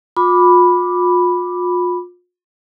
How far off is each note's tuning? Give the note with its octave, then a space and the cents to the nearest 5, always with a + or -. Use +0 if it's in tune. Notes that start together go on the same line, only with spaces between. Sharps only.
F4 +40 B5 +0 D6 +0